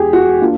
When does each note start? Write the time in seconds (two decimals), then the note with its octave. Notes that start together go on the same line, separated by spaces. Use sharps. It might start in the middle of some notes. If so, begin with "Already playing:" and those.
Already playing: E2 G#3 G4 G#4
0.13 F#4
0.41 A#3 D4 F4